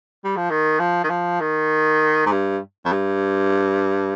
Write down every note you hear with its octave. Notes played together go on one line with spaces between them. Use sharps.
G3
F3
D#3
F3
D#3
F3
D#3
G#2
G2
F2
G2